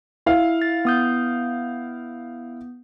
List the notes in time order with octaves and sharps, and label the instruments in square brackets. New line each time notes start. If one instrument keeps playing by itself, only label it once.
[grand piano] E4 F5
[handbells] A6
B3 D#6 G6